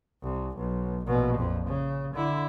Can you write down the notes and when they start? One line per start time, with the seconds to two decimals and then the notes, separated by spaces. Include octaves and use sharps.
0.23 C2
0.57 B1
1.07 A#1 B2
1.37 A#1 F2
1.67 C#3
2.14 D3 E4